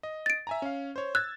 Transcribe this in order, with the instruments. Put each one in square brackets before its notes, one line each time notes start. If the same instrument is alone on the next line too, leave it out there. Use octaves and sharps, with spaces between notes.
[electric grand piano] D#5
[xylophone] A6 D7
[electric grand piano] E5 G#5 A#5
C#4 F5
C5 C#5
[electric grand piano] E6 G#6 A6 [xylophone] F#6